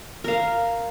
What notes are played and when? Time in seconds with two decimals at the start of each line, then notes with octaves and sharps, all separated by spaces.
0.24 A#4 F5